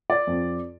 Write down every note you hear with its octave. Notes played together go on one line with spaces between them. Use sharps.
D5
F2